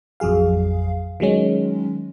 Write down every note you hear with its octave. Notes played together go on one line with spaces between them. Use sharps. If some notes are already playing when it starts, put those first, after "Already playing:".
A1 F2 F#3 G#4 F5
D#3 F#3 G#3 C#4